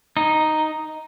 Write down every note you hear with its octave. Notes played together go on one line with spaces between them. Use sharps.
D#4